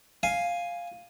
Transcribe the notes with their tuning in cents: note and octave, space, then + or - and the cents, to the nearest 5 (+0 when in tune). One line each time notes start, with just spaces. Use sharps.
F5 +0 G#5 +0